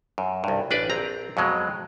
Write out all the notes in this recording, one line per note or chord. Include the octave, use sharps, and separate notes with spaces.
F#2
C2 G2
A1 D4 B4 D5
A#1 C4 A#5
F2 B2 F#3 G#3